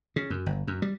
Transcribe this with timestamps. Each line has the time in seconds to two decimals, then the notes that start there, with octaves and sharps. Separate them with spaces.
0.16 C#3
0.30 F#2
0.46 G1
0.67 F#2
0.82 G3